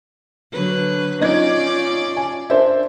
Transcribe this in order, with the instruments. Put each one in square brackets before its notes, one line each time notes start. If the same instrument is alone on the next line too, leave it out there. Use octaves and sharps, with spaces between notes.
[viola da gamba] D3 F#3 B4
[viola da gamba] C#4 F4 D5 [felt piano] D#4 G#6
[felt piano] G#5
D4 C5 E5